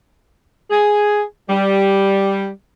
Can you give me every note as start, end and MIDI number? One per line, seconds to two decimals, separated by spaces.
0.71 1.22 68
1.49 2.48 55